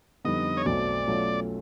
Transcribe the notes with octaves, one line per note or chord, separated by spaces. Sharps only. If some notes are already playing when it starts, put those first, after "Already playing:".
F2 D3 G3 B3 D#4 D#5
C#5
B1 B2 F#3 A3 C4 D5
B2 F#3 A3 C#4 F4